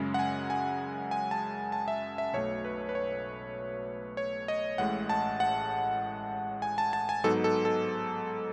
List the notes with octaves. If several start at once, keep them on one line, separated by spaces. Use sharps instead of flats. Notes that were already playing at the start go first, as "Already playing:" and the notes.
Already playing: F#2 C#3 G#3
F#5
G#5
G#5
G#5
A5
A5
E5
E5
B1 B2 A3 C#5
B4
B4
C#5
C#5
D#5
A1 A2 G#3 F#5
A5
F#5
G#5
A5
A5
G#5
G#2 F#3 B3 D#4 A4
A4
A4